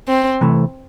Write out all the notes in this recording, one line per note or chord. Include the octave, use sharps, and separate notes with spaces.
C4
C3 E3 A3